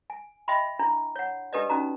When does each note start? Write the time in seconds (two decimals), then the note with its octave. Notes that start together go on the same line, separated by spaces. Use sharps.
0.10 G#5
0.48 D#5 E5 G5 B5 C6
0.79 D4 E4
1.16 C#5 F#5
1.53 D4 G4 A4 B4 D5 D#5
1.70 C#4 D#4 F#4 A#5